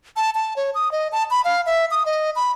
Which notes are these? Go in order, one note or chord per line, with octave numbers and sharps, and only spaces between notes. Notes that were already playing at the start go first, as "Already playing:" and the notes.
A5
A5
C#5
D#6
D#5
A5
B5
F5
E5
D#6
D#5
B5